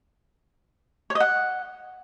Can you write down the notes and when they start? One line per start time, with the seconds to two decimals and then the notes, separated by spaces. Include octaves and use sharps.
1.10 C#5
1.15 D#5
1.20 F#5